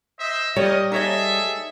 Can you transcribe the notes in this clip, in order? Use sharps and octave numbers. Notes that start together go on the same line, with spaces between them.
C5 D#5 E5
G3 G4 A#4 C#5 D#5
D#4 G#4 A4 C#5 D#5 E5